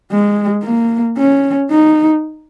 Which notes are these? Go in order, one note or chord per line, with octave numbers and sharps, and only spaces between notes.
G#3
A#3
C#4
D#4